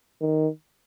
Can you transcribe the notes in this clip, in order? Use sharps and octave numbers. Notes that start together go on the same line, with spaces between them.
D#3